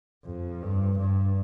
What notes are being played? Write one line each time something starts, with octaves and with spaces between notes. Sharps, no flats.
F2
G2
G2